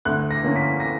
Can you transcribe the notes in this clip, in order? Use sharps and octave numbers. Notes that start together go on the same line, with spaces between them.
D2 F#6
A#6
D3 A#3 C#4
B6
A#6